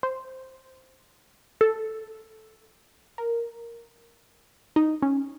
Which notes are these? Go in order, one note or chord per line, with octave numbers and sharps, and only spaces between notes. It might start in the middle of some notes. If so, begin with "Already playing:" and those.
C5
A4
A#4
D#4
C#4